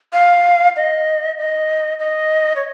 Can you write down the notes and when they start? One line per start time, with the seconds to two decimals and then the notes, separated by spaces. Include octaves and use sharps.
0.13 F5
0.76 D#5
1.38 D#5
1.99 D#5
2.56 C#5